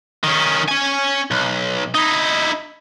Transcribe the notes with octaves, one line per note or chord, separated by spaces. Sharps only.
D#3 C#4
C#4 G#5
B1
D#4 E4